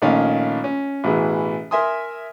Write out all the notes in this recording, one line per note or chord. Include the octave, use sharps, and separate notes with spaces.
A#1 D#3 A3 C#4 F5
C#4
A1 B2 E3 G#4
A#4 E5 G#5 C6 D#6